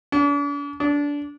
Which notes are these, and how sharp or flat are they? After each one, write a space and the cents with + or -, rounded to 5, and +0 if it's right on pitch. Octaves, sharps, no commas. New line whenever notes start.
D4 -40
D4 -20